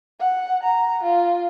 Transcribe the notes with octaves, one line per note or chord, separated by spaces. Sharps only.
F#5
A#5
F4